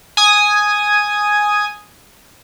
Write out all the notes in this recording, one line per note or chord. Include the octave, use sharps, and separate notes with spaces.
G#5 D#6